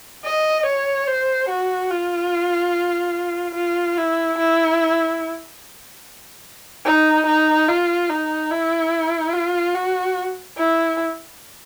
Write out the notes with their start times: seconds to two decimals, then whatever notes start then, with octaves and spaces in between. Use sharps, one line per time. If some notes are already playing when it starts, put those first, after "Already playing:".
0.25 D#5
0.66 C#5
1.07 C5
1.49 F#4
1.90 F4
3.55 F4
3.97 E4
4.38 E4
6.85 D#4
7.26 D#4
7.68 F4
8.09 D#4
8.51 E4
9.33 F4
9.75 F#4
10.57 E4